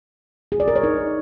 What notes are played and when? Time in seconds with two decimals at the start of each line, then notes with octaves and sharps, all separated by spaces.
0.52 G#4
0.60 D5
0.68 A#4
0.76 C#5
0.83 D#4